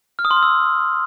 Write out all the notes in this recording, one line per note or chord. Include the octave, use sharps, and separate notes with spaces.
F6
D#6
C6
F6
E6